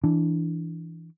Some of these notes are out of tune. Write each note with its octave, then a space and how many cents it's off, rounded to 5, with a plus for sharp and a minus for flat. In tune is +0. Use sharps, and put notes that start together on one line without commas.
E3 +0 D4 +0